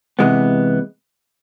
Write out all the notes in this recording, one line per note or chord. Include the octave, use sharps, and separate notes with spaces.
C3 E3 G#3 B3